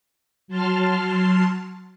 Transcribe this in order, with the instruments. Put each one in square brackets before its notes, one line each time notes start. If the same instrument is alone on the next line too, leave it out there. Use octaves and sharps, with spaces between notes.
[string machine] F#3 A5 C6 F6